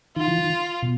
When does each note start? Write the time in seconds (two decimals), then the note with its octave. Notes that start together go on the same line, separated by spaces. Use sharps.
0.16 D#3 F4
0.28 E3
0.38 D#3
0.83 B2